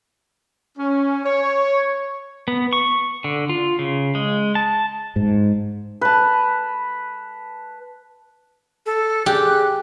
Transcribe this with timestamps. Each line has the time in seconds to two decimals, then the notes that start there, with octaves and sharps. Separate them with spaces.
0.77 C#4
1.25 C#5
2.48 B3
2.73 C#6
3.24 D3
3.49 F4
3.79 C#3
4.15 G#3
4.55 A5
5.16 G#2
6.01 B4 A5
8.86 A4
9.26 G4 G#4 F#6